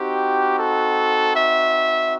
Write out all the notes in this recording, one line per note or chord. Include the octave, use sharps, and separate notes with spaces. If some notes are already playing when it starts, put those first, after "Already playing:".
Already playing: C4 D#4 F#4 G4
A4
E5